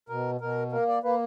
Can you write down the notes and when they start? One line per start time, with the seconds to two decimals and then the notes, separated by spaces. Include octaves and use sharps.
0.09 B2 A#4
0.41 B2 A#4
0.72 A#3 A#4
0.88 D5
1.03 A#3 B4